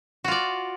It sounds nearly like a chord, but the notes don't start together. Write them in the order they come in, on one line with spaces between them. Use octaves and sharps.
F#4 F4 D5